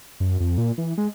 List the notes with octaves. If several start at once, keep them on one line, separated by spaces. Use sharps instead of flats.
F#2
F2
A#2
E3
G#3